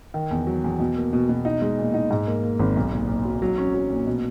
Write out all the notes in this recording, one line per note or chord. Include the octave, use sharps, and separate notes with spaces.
D#3
E2
F#3
E2
B2
A#3
B2
B2
D#4
G#3
A#2
D#4
G#2
A#3
A#3
G#1
B1
A#2
A#2
F#3
F#3
C#4
F#3
A#2
B2